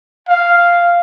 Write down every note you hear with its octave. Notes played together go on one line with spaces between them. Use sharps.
F5